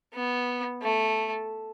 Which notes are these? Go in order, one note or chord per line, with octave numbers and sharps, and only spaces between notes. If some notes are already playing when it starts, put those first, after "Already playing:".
B3
A3